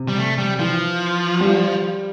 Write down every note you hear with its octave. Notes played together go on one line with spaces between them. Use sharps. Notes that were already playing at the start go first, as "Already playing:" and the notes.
Already playing: C3
G3
A3
G3
E3 F3
G3